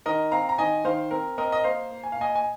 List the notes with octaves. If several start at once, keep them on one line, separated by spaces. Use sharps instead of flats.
D#3 A#4 D#5
C4 F5 A#5
A#5
D#3 D#5 G#5
D#3 C5 F5
C4 A#4
C4 A#4 D#5
D#5
A#3 C5 F5
A#3
G#5
F5
A#2 D#5 G#5
G#5